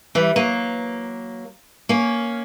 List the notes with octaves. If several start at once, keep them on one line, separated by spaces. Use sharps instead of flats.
E3 G3
F#3 A#3
A#3 C#4